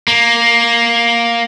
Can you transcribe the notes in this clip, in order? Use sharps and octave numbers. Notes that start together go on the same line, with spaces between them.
A#3